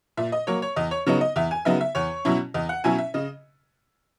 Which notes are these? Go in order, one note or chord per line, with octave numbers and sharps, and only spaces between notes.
A#2 E5
D#5
F#3 A#3 C#5
C#5
E2 D#5
C#5
C#3 F#3 B3 D#4 C#5
D#5
E2 E5
G#5
C#3 F#3 B3 D#4 E5
E5
E2 C#5
B2 F#3 C#4 E4
E2 D#5
F#5
B2 F#3 C#4 E4 G#5
E5
C#3 D#5